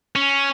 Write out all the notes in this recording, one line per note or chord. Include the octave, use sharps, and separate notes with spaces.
C#4